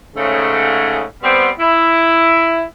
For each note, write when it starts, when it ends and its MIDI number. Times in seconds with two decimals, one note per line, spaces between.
0.16 1.03 44
0.16 1.03 49
0.16 1.03 57
1.23 1.50 55
1.23 1.50 59
1.23 1.50 60
1.59 2.62 64